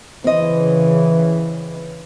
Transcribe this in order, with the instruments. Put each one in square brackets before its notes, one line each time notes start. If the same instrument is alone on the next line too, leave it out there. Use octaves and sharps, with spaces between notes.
[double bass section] C#3 E3 [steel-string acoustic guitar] C4 D#5